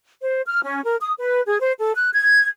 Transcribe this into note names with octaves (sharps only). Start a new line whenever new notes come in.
C5
F6
C#4
A#4
D#6
B4
G#4
C5
A4
F#6
G#6